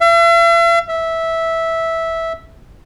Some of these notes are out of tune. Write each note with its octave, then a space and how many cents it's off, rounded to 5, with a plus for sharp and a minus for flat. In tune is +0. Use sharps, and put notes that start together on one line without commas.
E5 +45
E5 -10